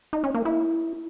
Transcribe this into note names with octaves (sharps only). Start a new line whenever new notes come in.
D#4
C#4
A#3
E4